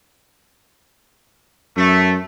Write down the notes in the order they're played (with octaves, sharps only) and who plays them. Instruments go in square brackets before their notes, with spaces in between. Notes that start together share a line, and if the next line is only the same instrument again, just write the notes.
[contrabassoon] F#2 [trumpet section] A3